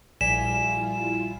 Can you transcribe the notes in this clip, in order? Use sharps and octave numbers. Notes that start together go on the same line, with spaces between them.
A#1 G3 E4 F4 D5 G#5 B6 E7